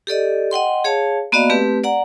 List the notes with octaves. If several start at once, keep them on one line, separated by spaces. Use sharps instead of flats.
G4 A4 D5 D#5
D#5 F#5 G5 C6
G#4 C#5 F5 A5
A#3 B3 F#4 D5 D#5 F5
A3 C4 G4 B4
D5 F#5 A#5